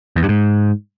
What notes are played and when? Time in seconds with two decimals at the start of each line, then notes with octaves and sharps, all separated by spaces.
0.16 E2
0.22 G2
0.29 G#2